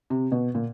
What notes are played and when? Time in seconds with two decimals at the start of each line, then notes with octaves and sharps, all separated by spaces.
0.10 C3
0.32 B2
0.55 A#2